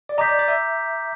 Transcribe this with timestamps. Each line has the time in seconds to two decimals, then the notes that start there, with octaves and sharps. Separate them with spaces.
0.09 D5
0.18 D#5 A#5 D6 G6 B6
0.28 D5
0.39 D5
0.48 E5